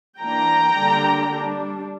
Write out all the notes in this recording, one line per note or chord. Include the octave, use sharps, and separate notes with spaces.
E3 A#3 D4 G5 A#5
D3 G3 A#3 D4
G3 D4